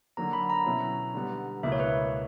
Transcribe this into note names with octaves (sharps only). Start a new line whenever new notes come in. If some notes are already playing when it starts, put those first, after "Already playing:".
D3 F#3 A#3 A#5
B5
A#5
B2 F#3 C#4 E4
D3 G3 B3
C#2 B2 A#3 E4 E5
C#5
B4